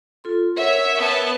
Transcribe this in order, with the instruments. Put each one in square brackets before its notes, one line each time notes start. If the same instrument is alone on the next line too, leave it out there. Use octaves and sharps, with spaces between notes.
[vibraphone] F4 A4 C6
[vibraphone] A#4 F#5 [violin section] C#5 E5
[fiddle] B3 A5